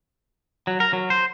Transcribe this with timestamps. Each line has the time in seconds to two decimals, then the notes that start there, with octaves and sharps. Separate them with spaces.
0.67 F#3
0.80 A#4
0.93 F#3
1.10 C5